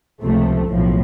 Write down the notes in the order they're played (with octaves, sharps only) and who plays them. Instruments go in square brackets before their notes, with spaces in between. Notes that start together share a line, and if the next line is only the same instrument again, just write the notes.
[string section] C#2 C3 F3 A3
B1 A2 F3